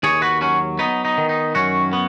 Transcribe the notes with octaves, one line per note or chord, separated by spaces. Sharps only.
D#2 G#4 C#5
F#4 B4
F#3 C#4 F#4
B3 D#4
D#4
D#3
D#4
F#2 C#4 F#4
B3